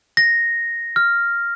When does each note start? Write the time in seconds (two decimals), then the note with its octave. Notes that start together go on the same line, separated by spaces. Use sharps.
0.17 A#6
0.96 F6